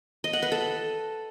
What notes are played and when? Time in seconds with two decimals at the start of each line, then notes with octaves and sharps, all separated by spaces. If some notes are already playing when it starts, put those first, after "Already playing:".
0.24 D#5
0.33 F#5
0.42 B4
0.52 A4